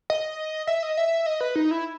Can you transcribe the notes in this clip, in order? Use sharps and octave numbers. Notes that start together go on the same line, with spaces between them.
D#5
E5
D#5
E5
D#5
B4
D#4
E4